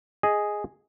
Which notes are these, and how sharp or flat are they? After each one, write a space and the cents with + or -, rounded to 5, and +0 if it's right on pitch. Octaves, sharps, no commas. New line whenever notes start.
G#4 +0 D#5 +0